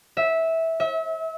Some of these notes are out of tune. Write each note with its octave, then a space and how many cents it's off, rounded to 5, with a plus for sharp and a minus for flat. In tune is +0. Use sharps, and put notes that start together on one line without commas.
E5 -15
E5 -35